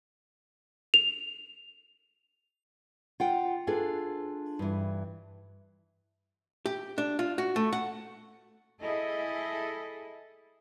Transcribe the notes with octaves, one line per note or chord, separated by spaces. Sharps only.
F7
F4 F#5 G5
D4 F4 G#4 A4 B4
G2 E3
G4
D4
F4
F#4
A3
F#5
E4 G#4 A4 D#5